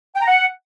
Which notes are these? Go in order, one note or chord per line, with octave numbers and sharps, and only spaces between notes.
G5
A#5
F#5